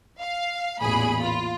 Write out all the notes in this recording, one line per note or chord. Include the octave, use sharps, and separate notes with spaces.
F5
A1 E2 A#2 G#4 B5
F4